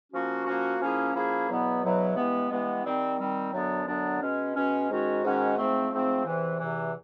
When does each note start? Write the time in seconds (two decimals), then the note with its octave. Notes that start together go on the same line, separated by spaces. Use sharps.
0.11 F3 A#3 C#4 F#4
0.46 F3 A#3 C#4 F#4
0.80 F3 A#3 C#4 E4 G#4
1.14 F3 A#3 C#4 E4 G#4
1.48 E2 B2 F#3 B3 E4
1.82 E2 B2 F#3 B3 E4
2.16 G2 E3 G#3 B3
2.50 G2 E3 G#3 B3
2.85 D#3 G3 C4
3.19 D#3 G3 C4
3.53 F#2 D3 F#3 B3 D4
3.87 F#2 D3 F#3 B3 D4
4.21 B2 G#3 C#4
4.55 B2 G#3 C#4
4.89 G#2 D#3 G#3 C#4 F#4
5.23 G#2 D#3 G#3 C#4 F#4
5.58 G#2 F3 A3 C4
5.91 G#2 F3 A3 C4
6.25 E2 C3 E3
6.59 E2 C3 E3